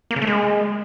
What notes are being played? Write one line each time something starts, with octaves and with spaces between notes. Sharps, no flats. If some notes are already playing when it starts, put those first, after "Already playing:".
A#3
C#3
A3
G#3